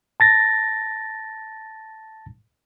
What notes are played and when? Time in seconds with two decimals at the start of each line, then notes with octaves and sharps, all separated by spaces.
0.20 A5 A6 A#6